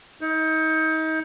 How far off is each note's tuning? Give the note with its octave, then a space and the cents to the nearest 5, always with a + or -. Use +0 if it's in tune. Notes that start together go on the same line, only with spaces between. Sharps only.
D#4 +30